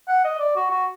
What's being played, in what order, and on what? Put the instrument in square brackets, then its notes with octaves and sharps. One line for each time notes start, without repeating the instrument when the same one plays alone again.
[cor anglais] F#5
D#5
D5
F#4
F#4